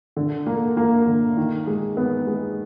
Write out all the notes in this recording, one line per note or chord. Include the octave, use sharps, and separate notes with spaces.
D3
A#3
A#3
D3
D#3
G#3
B3
G#3